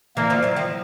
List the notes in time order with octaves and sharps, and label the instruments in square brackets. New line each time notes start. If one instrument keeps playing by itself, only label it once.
[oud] D3 E3 [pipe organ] A#3
[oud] D#3 F3
E3 F#3
D#3 F3